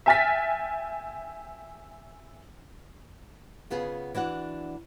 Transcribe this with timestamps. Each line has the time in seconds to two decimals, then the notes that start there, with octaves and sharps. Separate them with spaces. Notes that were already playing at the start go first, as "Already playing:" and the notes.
0.06 E5 G5 G#5 F6 A6 B6
3.70 C#3 B3 F4 G#4
4.15 E3 D4 F#4 F#5